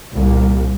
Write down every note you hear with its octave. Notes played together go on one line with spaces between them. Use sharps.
C2 A#2